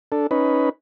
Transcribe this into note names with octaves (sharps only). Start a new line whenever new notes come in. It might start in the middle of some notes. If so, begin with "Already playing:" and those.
D4 A4
C#4 D#4 B4